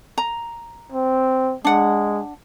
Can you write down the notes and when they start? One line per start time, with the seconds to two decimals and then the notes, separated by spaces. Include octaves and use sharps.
0.18 A#5
0.93 C4
1.65 G#3 D4 F#5